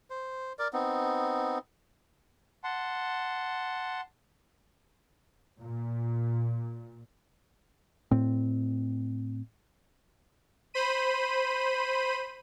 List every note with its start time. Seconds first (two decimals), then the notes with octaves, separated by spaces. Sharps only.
0.10 C5
0.59 A#4 D5
0.73 B3 C4 D#4
2.64 F#5 A5 C6
5.61 A#2
8.11 A2 C4
10.74 C5 B5 D#7